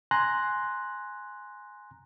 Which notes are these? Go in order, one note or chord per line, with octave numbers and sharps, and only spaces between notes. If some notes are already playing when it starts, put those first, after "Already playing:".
G#5 A#5 C6 F#6 A#6